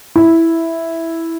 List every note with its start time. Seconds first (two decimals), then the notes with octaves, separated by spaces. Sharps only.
0.16 E4